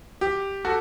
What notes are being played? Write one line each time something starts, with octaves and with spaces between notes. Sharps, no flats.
G4
F#4 A4